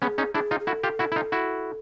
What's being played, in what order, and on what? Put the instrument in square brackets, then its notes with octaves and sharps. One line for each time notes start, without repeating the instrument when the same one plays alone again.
[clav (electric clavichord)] B3 C#4 [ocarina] G#4
[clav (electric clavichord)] C#4 D#4
[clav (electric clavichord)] D4 E4 [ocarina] G#4
[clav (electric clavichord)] D#4 F4
[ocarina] G#4
[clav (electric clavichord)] E4 F#4 [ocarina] A4
[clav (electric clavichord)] F4 G4
E4 F#4
E4
D#4 F4
E4 F#4